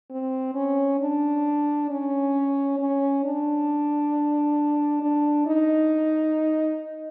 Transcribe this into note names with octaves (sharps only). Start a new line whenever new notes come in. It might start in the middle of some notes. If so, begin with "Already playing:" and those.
C4
C#4
D4
C#4
C#4
D4
D4
D#4